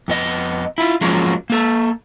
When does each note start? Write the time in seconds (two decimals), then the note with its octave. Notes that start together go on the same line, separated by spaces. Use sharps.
0.08 F2 B3 D#5
0.78 E4 F4
1.01 F3 F#3 G#3 A#3 C#4 F4
1.50 A#3 A4